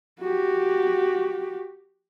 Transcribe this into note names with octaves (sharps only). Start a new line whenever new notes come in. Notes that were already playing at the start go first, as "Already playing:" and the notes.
F#4 G4